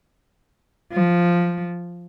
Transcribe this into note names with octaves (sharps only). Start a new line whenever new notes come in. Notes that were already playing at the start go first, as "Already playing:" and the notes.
F3